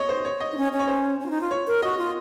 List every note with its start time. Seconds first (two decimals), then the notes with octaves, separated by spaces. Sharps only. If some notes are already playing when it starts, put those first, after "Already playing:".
Already playing: C#5 D#5
0.09 C5
0.25 C#5
0.40 D#5
0.52 D#4
0.57 C#4
0.72 C#4
0.79 C#5
0.88 C5
1.20 C#4
1.26 F4
1.30 D#4
1.41 F4
1.51 C#5
1.67 A#4
1.82 F#4 D#5
1.98 F4